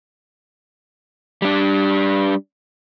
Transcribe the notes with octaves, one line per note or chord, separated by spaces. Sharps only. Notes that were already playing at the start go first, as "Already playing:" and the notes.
G3 D4